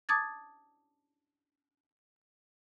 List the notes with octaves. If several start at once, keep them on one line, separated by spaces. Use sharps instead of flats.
A5 D6 D#6 G#6 A6